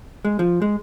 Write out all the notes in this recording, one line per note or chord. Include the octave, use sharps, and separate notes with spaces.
G#3
F3
G#3